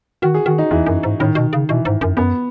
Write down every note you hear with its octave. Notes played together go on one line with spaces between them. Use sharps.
D#3 F#4
G#4
D#3 F#4
D#4
E2 E3
F#2
G#2
A2 D#3
B2
C#3
B2 E3
G#2
F#2
F#2 B3